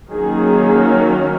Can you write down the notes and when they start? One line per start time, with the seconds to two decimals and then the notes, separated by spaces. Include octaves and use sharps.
0.11 D#3 F#3 A#3 C#4 G#4
0.86 A#4